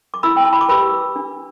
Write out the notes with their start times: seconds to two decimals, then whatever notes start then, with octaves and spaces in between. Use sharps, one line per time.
0.14 D6
0.23 E4 B5 E6
0.37 G5
0.45 A5
0.53 B5
0.61 D6
0.69 G4 B4 B5 E6
1.16 D4